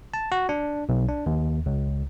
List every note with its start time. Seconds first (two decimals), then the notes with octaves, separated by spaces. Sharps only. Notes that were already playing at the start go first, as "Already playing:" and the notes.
0.14 A5
0.32 F#4
0.49 D4
0.89 B1
1.08 D4
1.26 D#2
1.66 C#2